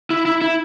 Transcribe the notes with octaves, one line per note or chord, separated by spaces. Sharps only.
E4
E4
E4